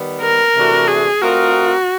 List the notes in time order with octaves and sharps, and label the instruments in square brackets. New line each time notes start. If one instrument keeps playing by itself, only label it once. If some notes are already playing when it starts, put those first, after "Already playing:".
Already playing: [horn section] D#3 G3 B3
[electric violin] A#4
[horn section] C3 E3 A3 D4 F#4
[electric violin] G#4
[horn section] A3 C4 F4 A#4 D#5 [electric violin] F#4